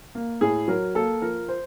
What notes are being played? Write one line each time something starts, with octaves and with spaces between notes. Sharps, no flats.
A#3
A2 G#4
F#3 A#4
A#3 A4
F3 A#4
C5